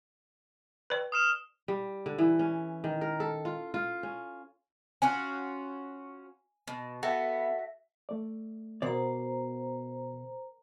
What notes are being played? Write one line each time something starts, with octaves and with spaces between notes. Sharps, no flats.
B4 D5
D#6 F6 E7
G3
D3
E3
C#4
D#3
A#4
A4
F4
F4
C#4
C#4 F4 F#4 G#5
B2
B3 F#4 A4 E5
A3 D5
B2 F#4 A#4 C5 D5 A#5